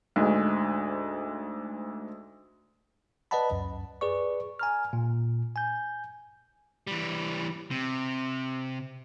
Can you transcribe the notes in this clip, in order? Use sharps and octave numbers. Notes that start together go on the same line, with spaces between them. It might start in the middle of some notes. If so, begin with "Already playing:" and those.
D2 G#2 G#3
B4 D5 D#5 F#5 A5 B5
C#2 F#2
G#4 B4 D5 C#6
G#5 A#5 F6
A#2
G#5 G6
E3 G3
C3